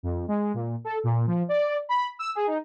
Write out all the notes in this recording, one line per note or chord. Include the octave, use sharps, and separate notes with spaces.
F2
G#3
A#2
A4
A#2
F3
D5
B5
E6
G#4
D#4